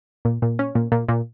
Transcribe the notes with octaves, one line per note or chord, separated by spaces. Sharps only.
A#2
A#2
C#4
A#2
A#2
A#2